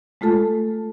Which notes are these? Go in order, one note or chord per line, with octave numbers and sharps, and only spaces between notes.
G#3 A3 F4 A4 A5